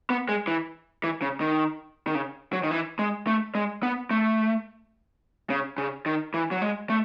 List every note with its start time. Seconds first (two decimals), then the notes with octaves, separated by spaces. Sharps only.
0.10 B3
0.29 G#3
0.47 E3
1.04 E3
1.22 C#3
1.41 D#3
2.07 D#3
2.15 C#3
2.53 F#3
2.64 D#3
2.71 E3
2.99 G#3
3.27 A3
3.55 G#3
3.83 B3
4.10 A3
5.50 C#3
5.78 C#3
6.06 D#3
6.34 E3
6.51 F#3
6.62 G#3
6.90 A3